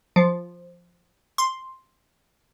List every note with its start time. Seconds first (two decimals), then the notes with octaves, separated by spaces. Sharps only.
0.16 F3
1.38 C6